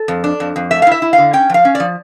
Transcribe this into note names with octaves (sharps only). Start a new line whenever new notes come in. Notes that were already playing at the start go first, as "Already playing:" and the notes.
Already playing: A4
F2
D4
F2
F2
A3 E5
F5
E4 E5
E4
F5
D3
C#4 G5
F3 F5
C#4
F3 D5